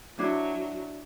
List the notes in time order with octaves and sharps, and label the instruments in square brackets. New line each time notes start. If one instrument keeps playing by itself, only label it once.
[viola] F#3 [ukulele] D4 E4